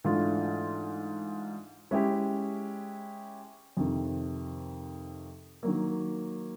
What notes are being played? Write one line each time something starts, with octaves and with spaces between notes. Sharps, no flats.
G#2 E3 A3 D4 F4
G#3 C#4 E4 G4
F2 C3 D#3
D#3 F#3 A#3